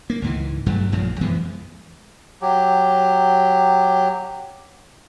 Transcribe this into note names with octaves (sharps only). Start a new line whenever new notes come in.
A#3
C#2 G#2 E3
G1 G2 F#3 A3
A#1 F#2 F3 G#3
F2 E3 G#3 B3
F#3 G4